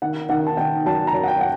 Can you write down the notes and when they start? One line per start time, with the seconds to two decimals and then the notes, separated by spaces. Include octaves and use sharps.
0.02 D#3 F#5
0.29 D#3 F#5
0.47 A5
0.57 D#3 G5
0.86 F#2 A5
1.07 A#5
1.14 F#2
1.23 F#5
1.28 G5
1.41 F#5